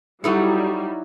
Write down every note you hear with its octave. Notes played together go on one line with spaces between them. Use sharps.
F#3 G3 D#4 E4 F#4 A4